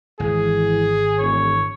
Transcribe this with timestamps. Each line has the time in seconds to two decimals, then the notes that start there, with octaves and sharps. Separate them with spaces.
0.20 G#1 E3 G#4
1.18 E1 C#5